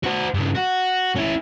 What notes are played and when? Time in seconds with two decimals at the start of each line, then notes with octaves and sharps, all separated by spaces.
0.04 F#4 C5
0.34 G2 C#3
0.55 F#4
1.16 C#4 E4